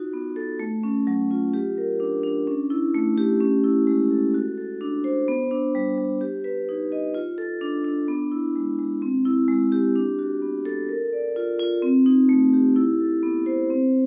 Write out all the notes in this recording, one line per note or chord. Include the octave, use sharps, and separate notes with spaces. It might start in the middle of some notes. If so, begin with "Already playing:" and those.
Already playing: D#4 F4 F#4
B3
A4
A3
C#4
F#3
F4
G4
A#4
D4
D4
C#4
E4
A3
G4
C#4
E4
G#3
A4
F#4
A4
D4
C5
B3
D4
G3
G3
G4
B4
D#4
D#5
F4
A4
D4
D4
B3
E4
G#3
G#3
C4
E4
G#3
G4
D4
F#4
B3
A4
A#4
D5
F4
F4
C4
D#4
A3
G4
E4
A4
B3
C5
C4